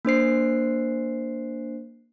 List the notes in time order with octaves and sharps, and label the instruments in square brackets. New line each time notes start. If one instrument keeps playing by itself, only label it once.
[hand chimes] A#3 D4 C5 C7